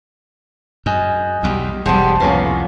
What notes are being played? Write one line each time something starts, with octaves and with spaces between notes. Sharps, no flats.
F#2 G#4 D#5 G#5
B1 E2 G3
E1 B1 G3 G#4 C5 F#5 A5
C2 F2 A2 A#3 B3 C#4 A5